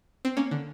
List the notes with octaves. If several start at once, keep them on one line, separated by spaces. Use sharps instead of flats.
C4
A#3 C#4
D3